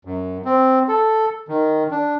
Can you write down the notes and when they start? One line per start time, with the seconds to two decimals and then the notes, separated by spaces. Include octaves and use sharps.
0.05 F#2
0.45 C4
0.89 A4
1.48 D#3
1.91 D4